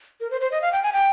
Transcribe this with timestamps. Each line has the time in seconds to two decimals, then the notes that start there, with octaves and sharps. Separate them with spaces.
0.21 A#4
0.31 C5
0.41 C5
0.52 D#5
0.62 F5
0.72 G5
0.83 G#5
0.93 G5